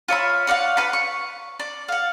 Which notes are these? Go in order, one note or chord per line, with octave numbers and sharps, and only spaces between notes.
F4 C#5 E5 B5
C#5 D5 F5 F#5
B4 F5 F#5 B5
C#6
D5
F5 F#5